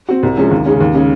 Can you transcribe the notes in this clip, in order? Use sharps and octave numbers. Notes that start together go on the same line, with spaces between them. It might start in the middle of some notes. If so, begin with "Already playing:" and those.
C4 F#4
C2
C3 F3 G#3 C#4
D#2
C#3 G#3 C#4
D#2
C#3 G#3 C#4